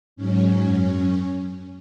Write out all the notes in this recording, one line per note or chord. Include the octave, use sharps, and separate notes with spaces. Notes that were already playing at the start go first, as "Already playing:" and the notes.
G#2 F#3 C#4
F#2